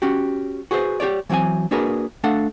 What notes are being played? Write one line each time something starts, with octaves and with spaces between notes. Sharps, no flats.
C#4 F#4 G4
F#4 G#4 B4 C5
G4 G#4 C#5 D5
E3 F#3 C4 F5 G#5
A#3 D4 F#4 G#4 A#4 B4
A3 D4 A4 F5 F#5